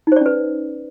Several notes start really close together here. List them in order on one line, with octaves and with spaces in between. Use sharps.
D#4 C5 D5 C#4 B4